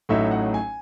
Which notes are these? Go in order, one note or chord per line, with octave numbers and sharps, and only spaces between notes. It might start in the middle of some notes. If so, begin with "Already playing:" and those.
A1 A2 F#3 A3 D#4 E5
F#5
G#5